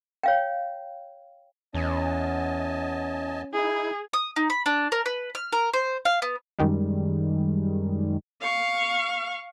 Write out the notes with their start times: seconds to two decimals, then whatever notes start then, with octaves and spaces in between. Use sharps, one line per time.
0.23 C#5 F5 G5
1.74 E2 C#4 D#5 G#5 A5
3.53 D#4 E4 G#4
4.13 D#6
4.36 D#4
4.50 B5
4.66 D4
4.92 A#4
5.06 B4
5.35 F6
5.53 A#4
5.74 C5
6.05 F5
6.22 B3
6.59 F#2 D#3 G3 G#3
8.41 F5 C#6